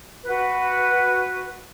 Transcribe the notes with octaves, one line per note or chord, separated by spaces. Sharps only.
F#4 B4